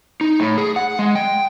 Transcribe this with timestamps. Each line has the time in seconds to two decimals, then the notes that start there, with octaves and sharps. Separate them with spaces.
0.21 D#4
0.40 A2
0.58 G#4
0.76 F#5
0.99 G#3
1.15 G5